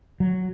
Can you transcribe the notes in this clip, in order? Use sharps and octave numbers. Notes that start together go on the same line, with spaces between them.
F#3